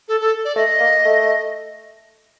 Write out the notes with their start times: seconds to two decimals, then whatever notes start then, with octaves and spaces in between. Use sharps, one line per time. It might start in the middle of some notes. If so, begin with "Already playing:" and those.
0.08 A4
0.20 A4
0.45 D5
0.56 A3 D#5
0.80 A#3
1.05 A3